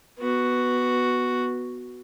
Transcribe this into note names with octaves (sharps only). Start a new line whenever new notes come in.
B3 F#4